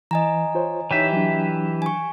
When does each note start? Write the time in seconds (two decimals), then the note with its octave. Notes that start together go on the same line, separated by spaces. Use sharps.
0.11 E3 D#5 G#5 A#5
0.55 F4 C5 C#5
0.91 E3 D#4 G4 C#5 E5
1.12 F#3 D4
1.82 G#5 C#6